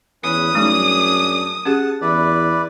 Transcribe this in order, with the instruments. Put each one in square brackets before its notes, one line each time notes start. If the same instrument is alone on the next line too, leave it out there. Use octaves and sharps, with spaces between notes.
[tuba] E2 [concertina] C#4 G#4 B4 [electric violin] D#6
[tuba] F#2 [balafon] G3 A3 D#4 [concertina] D4 G#4
[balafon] C#4 G4 G#4 [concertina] F#5 A5
[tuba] E2 [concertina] E4 B4 D5